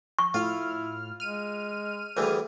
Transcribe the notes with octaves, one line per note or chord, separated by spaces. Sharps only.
C#6
A2 E4 F4 F6
G#3 F6 D#7
D2 E3 G3 G#4